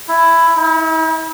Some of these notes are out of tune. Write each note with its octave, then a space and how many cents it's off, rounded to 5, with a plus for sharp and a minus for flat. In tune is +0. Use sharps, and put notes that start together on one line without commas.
E4 +10
E4 -45